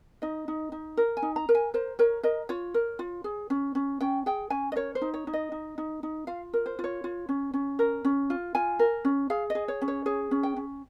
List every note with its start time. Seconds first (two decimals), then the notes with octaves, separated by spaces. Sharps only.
0.22 D#4 D#5
0.48 D#4
0.72 D#4
0.97 A#4
1.17 G#5
1.22 D#4
1.36 A#5
1.49 A#4
1.55 G#5
1.74 A#4 C5
1.99 A#4 C#5
2.23 A#4 D#5
2.49 F4 C#5
2.74 A#4
2.99 F4
3.24 G#4
3.50 C#4
3.75 C#4
4.01 C#4 G5
4.26 G#4 G5
4.50 C#4 G#5
4.72 D#5
4.76 A#4 C#5
4.95 C5
5.02 D#4
5.14 C#5
5.27 D#4
5.33 D#5
5.52 D#4
5.78 D#4
6.03 D#4
6.27 F4 F5
6.54 A#4
6.66 C5
6.79 F4
6.84 C#5
7.04 F4
7.29 C#4
7.54 C#4
7.79 A#4
8.05 C#4
8.30 F4
8.55 F4 G#5
8.79 A#4
9.05 C#4
9.30 G#4 F5
9.50 D#5
9.55 G#4
9.68 C#5
9.82 C#4
9.88 C#5
10.06 G#4 C#5
10.31 C#4
10.43 G5
10.57 C#4